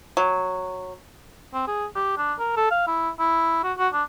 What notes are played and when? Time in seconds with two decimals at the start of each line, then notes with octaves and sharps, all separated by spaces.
0.17 F#3
1.54 C4
1.67 G#4
1.95 G4
2.17 D4
2.39 A#4
2.57 A4
2.71 F5
2.87 E4
3.20 E4
3.64 F#4
3.78 F#4
3.94 D4